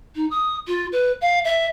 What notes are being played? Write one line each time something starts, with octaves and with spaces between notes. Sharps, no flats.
D#4
D#6
F4
B4
F5
E5